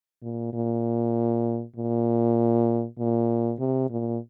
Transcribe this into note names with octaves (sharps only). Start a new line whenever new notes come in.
A#2
A#2
A#2
A#2
C3
A#2